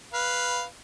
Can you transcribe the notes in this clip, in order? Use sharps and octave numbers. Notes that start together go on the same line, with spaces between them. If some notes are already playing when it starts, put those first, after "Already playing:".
B4 F5